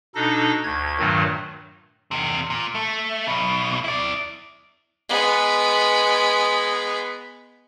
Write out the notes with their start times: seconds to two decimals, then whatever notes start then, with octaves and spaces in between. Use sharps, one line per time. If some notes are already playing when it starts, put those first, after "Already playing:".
0.15 B2 D4 D#4 A4 A#6
0.64 D2 G#6
0.99 G2 A#2 D#3 F#3 A3
2.11 E2 C3
2.50 A#2
2.75 A3
3.27 B1 B2
3.84 E4 D5
5.09 G#3 B3